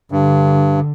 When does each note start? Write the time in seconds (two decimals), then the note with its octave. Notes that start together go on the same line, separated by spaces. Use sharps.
0.12 G2 D3